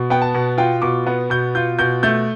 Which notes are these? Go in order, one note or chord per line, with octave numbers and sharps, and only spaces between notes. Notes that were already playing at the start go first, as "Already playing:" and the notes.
Already playing: B2
B3 G5
A5
B2
F4 G5
B2 D6
B3
B2 G6
F4 G6
B2 G6
A3 G6